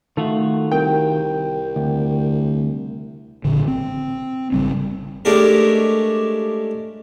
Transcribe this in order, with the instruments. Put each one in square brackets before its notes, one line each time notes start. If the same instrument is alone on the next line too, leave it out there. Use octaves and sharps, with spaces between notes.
[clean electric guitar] D#3 F4 F#4 [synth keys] A3
[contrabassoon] C2 [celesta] A#4 [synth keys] G5
[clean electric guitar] D2
[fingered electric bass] A1 A#2 D3
C4
G#1 C#3 G3 C4
[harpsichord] G#3 A3 C#4 D4 G4 A#4